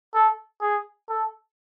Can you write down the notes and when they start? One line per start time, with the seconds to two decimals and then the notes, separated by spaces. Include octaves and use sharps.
0.14 A4
0.61 G#4
1.09 A4